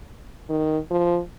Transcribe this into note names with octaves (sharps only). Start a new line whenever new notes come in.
D#3
F3